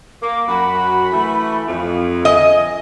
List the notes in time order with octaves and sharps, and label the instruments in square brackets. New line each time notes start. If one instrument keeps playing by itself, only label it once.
[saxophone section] A#3 [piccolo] D6
[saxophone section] F#2 F#4 [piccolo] B5
[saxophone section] E3 A3
F2
[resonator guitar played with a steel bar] D#5 [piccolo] G#5